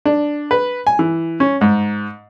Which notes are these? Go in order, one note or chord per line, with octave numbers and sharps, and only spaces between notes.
D4
B4
G#5
E3
C#4
G#2